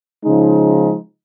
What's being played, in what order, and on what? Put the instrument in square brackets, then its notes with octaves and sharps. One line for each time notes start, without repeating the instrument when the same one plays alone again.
[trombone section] C#3 F3 G#3 D#4